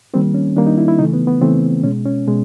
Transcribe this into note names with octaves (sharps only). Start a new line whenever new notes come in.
D#3 G3 A#3 C4
C#4
D#3 G3 A#3 D4
D#4
E4
E4
C#3 E3 A3 D#4
B3
B3
C#3 E3 A3 C4
B2 G#3 C#4
C#4
B2 G#3